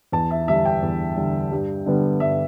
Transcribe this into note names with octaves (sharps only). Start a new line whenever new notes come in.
E2 A5
E5
D3 G3 E5
G5
E2
D3 G3
G2
D3 G3 B3
G2 E5